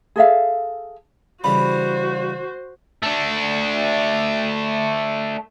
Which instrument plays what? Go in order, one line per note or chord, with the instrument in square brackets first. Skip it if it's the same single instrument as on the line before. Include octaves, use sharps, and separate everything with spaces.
[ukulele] G#4 A4 E5 F5
[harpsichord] C#3 E3 G3 [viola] F#4 C5 [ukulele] B5
[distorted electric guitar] A3 D4